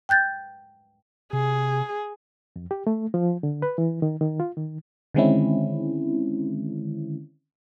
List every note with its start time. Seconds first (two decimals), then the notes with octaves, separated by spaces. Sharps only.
0.09 G5 F#6 G6 A6
1.33 C3 G#4
2.56 F2
2.71 G4
2.87 A3
3.14 F3
3.43 D3
3.62 B4
3.78 E3
4.02 D#3
4.21 D#3
4.40 F4
4.57 D#3
5.14 D3 D#3 G#3 C4 C#4 E4